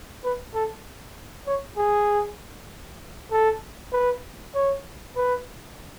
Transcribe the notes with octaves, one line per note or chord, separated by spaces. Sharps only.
B4
A4
C#5
G#4
A4
B4
C#5
B4